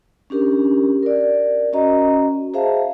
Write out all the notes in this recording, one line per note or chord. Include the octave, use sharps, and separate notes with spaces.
C#4 D4 G4 A#4
A#4 D5
C#4 F#4 D#5 A#5
G#4 C5 E5 F5 A5